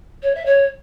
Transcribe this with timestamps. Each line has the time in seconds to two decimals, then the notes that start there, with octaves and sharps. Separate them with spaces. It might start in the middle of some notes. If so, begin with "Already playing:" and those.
0.23 C#5
0.35 E5
0.46 C#5